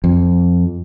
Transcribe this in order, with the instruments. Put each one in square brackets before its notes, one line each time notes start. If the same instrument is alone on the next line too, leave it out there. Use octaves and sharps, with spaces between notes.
[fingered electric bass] F2